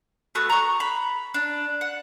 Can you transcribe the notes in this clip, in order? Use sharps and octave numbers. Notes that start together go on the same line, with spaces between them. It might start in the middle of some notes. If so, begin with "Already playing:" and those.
A3 B3 F#4
A#5 C#6
B5
D4
F#5